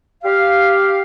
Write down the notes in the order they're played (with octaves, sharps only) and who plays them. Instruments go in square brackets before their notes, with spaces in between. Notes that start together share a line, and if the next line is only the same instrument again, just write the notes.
[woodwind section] G4 F5